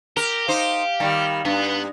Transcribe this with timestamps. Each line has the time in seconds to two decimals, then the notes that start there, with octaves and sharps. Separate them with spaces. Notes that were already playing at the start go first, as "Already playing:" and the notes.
0.17 G4 A#4
0.48 D#4 C5 F5
1.00 D#3 G3
1.45 G2 B3